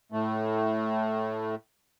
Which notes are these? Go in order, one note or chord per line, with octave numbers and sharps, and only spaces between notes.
A2 A3